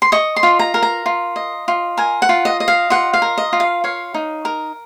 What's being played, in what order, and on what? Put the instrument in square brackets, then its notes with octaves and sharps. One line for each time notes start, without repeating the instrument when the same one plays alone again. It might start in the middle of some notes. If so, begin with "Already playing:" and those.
[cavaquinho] C6
D#5 C#6
C6
F4
A#5
A#4
A#5
F4
D#5
F4
A#4 G#5
F#5
F4
D#5
D#5
F5
F4 F#5
F5
A#4
D#5
F4
F5
C#5 F5
D#4
A#4